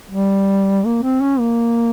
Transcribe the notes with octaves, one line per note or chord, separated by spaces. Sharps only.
G3
A#3
C4
C#4
A#3